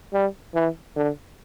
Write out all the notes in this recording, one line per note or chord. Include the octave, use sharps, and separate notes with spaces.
G3
E3
D3